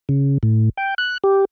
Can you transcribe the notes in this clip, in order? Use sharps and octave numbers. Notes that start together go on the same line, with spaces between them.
C#3
A2
G5
F#6
G4